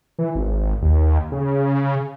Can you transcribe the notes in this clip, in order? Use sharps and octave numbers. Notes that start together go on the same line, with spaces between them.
E3
G#1
D#2
C#3